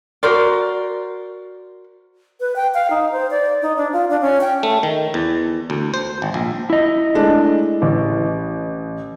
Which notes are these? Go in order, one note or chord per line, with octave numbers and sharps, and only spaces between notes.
F#4 A#4 C5 D5
B4
G5
F5
D#4
C5
D5
D#4
D4
F4
D4
C#4
G5
A3
D#3
E2
D2
C5
G#1
A#1
E4 D#5
G#3 A3 D4
A1